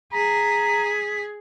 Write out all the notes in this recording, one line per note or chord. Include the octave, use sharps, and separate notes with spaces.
G#4 A#5 B6